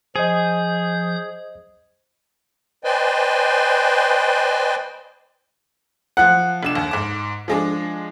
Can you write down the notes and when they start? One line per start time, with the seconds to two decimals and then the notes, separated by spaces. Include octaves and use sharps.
0.16 F3 G#4 C5 D#5 D#6 G6
2.84 B4 C5 D5 D#5 G5 G#5
6.17 F3 F#5 F#6
6.63 F1 D4 E7
6.75 D#2
6.91 G#2 D6
7.48 F3 G#3 D4